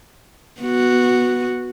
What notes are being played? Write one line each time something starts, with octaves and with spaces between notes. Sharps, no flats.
B3 F#4